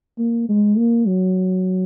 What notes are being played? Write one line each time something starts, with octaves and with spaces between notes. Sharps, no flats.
A#3
G#3
A#3
F#3